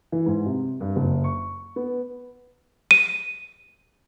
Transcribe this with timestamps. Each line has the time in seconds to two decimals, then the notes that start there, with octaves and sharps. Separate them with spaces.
0.12 E3
0.26 G#2
0.46 C3
0.81 G2
0.96 F#1
1.24 C#6
1.76 B3
2.91 D#7